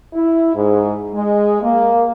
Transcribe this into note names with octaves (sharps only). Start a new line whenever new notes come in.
E4
G#2
G#3
A#3